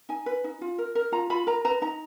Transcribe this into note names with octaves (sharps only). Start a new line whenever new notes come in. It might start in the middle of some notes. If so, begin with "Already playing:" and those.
D#4 G#5
B4
D#4
F4
A#4
A#4
F4 A#5
F4 B5
A#4 A#5
B4 A#5
D#4 A#5